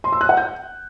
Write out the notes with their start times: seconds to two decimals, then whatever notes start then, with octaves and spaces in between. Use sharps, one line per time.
0.04 C6
0.12 E6
0.21 F#6
0.29 F#5
0.37 G6